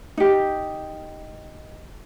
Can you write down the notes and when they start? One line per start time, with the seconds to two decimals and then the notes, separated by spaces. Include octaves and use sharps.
0.17 D#4 G4